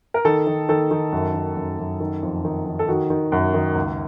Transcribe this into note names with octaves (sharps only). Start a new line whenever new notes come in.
A#4
D#3 A4
D#3
D#3 A4
D#3
F#2
D#3
F#2
F#2
D#3
F2
D#3
D#3
A4
D#3 F#4
D#3
F#2
D#3
C#2